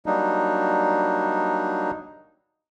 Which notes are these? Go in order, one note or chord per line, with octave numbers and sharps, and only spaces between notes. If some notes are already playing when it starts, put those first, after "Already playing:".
F#3 G3 A#3 D4 D#4